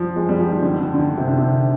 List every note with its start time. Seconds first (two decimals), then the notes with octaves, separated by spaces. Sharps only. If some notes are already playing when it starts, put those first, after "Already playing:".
Already playing: F3 G3
0.16 G#3
0.29 G3
0.40 F3
0.51 D#3
0.63 D3
0.73 D#3
0.80 D3
0.94 D3
0.99 D#3
1.17 C3
1.28 D3
1.38 C3